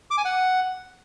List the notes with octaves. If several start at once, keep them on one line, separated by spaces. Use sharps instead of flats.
D6
G#5
F#5